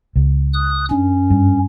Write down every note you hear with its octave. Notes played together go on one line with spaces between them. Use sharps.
C#2
D#6 F#6
F#2 C#4 D4
G2